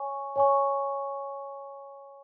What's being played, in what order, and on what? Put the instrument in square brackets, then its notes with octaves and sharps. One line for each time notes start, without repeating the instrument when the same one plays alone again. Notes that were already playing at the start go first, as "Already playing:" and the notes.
Already playing: [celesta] C#5 G#5 C#6
C#5 G#5 C#6